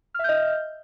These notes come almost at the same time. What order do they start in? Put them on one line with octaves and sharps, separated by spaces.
F6 E5 G6 D#5